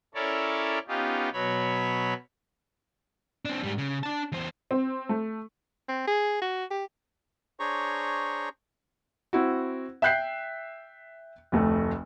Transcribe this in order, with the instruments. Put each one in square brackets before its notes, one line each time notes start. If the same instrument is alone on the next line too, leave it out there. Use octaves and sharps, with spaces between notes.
[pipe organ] C#4 E4 A4 A#4 C#5 D5
B3 C#4 D#4 F4 G4
B2 F#3 C#5 B5
[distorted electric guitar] C4 D4
G#2 G3
C#3
D4 A5
E2 C5
[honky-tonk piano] C4
A3
[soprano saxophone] C4
G#4
F#4
G4
[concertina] D4 G#4 C5 C#5 A#5 C#6
[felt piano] C4 E4 F#4
E5 G5 F#6 G6 C7
F1 D2 A3